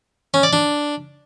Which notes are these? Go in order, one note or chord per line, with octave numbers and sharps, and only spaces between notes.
C#4
D5
D4